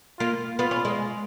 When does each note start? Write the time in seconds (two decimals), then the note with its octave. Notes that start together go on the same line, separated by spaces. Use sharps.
0.19 A#3 F4
0.59 B3 F4
0.71 C#4
0.85 G#3